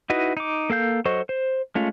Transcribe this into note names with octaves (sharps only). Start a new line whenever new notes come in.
D#4 E4 F#4 B4 D#5
D#4 D6
A#3 A4 F5 G6
F#3 A4 C5 D#5 C#6
C5
G#3 A3 C#4 F4